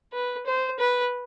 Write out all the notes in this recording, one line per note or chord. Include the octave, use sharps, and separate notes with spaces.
B4
C5
B4